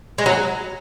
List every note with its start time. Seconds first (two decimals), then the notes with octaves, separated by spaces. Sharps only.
0.18 G#3
0.26 F#3